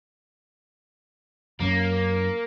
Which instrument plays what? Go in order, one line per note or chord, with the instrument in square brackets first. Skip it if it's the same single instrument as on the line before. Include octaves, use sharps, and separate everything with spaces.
[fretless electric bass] F#2 C#4 [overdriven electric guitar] A#3